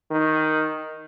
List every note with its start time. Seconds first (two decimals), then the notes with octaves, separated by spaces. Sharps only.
0.11 D#3